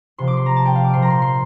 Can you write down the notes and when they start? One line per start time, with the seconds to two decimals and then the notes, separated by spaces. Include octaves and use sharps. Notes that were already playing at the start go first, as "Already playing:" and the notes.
0.18 C3 F3 C6
0.28 D6
0.37 C6
0.46 A#5
0.56 A5
0.65 G5
0.75 F5
0.84 D6
0.93 A#2 F3 C6
1.02 A#5
1.10 C6
1.22 C6